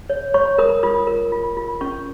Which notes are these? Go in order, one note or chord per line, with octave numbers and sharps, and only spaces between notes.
C#5
C#5 C#6
A#4 D#6
F4 D#6
A#4
F4
F4
C#4 C#6